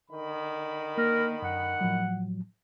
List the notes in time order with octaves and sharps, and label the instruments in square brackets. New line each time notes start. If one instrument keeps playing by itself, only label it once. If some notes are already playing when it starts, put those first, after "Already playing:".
[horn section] D3 D#3 B5
[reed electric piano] A#3 [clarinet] A#4
[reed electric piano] F#2 [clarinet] F#5
[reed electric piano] A2 F3 F#3